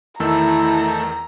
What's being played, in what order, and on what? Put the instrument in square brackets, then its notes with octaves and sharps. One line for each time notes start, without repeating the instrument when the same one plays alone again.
[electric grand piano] E2 D#3 E6 [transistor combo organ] A3 [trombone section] E4 [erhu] A#5